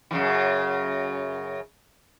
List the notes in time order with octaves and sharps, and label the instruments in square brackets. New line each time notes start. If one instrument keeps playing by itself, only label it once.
[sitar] F#2 C#3 E3